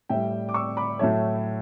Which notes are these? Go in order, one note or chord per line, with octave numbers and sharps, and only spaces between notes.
A2 G3 E5 G5
D6
C#6 E6
B5 D6
A2 F#3 A3 C#5 E5